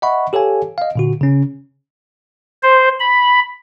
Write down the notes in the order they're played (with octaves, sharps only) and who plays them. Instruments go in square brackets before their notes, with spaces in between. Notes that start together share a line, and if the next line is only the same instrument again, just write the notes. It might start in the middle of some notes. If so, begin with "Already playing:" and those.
[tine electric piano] D#5 E5 F#5 B5 C#6
G4 A4 C#5 F5 G#5
D#5 F5
A#2 D3 F#4
C#3 C#4
[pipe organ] C5
B5